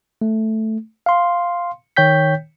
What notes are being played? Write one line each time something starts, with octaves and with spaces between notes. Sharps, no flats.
A3
F5 C6
D#3 C#5 G5 G6 B6